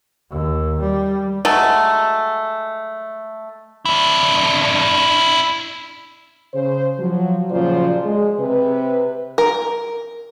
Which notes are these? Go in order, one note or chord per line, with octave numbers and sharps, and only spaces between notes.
D#2
G3
F#3 G#3 A3
D4 E4
C#3 C5
F3 F#3
A#2 C#3 F3 F#3 C5 D5
G#3
C3 B4
A#4